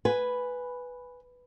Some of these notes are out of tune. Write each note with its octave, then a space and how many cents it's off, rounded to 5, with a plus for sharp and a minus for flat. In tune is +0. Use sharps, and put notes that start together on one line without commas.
B4 +0 G#5 +0